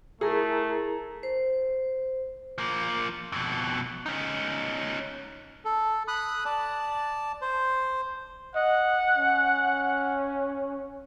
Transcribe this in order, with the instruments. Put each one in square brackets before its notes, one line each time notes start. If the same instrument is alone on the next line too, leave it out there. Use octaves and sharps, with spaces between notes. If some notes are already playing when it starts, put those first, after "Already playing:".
[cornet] A3 [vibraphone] E4 A#4 A#5 [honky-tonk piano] G#4
[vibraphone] C5
[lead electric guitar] F3 A#3
F2 B2
C#4 D#4
[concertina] A4
B5 D#6 F#6
D5 A5
C5
[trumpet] D#5 [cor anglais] F#5
[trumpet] C#4